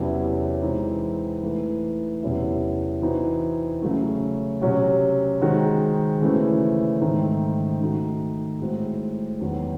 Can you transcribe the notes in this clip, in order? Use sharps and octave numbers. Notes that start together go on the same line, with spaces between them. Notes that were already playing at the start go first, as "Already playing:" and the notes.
Already playing: E2 C3 F#3 C#4 E4
E3 G#3 C4 D#4
E3 A3 D#4
E2 C3 F#3 C#4 E4
E3 C4 D#4 F#4
C#3 F#3 A3
C3 F#3 C#4 F#4
D#3 G#3 C4 D#4 F#4
C#3 E3 A3 C4 E4
G#2 D#3 A3 C4 D#4
D#3 A3 D#4 F#4
A2 G#3 C4 F#4
E2 D#3 F#3